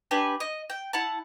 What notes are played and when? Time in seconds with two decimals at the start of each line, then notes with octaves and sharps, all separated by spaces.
0.11 D4 G4 B4 G#5
0.40 D#5
0.70 G5
0.93 E4 F#5 A5